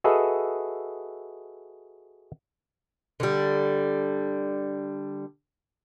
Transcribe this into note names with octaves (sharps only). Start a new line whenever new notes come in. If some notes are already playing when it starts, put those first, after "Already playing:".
F#4 G#4 A4 B4 D#5 E5
D3 G3